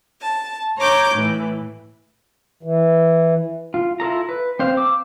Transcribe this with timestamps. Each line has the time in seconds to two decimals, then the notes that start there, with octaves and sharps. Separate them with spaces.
0.22 A5
0.78 C#5 A#5 D6 G6
1.15 A2 E3
2.63 E3
3.74 F4
4.00 E4 F4 A4 A#5
4.29 B4
4.59 C4 C5 F5
4.77 D6 E6